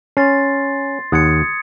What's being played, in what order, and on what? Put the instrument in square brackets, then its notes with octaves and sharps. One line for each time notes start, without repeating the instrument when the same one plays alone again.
[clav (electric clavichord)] C#4 [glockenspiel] C6 A6 C7
[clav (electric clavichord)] D#2 F#5 [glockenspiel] D#6 G#6 C#7